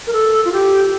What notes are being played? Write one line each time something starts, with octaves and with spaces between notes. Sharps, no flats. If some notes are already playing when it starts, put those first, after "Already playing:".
A#4
A4
F4
G4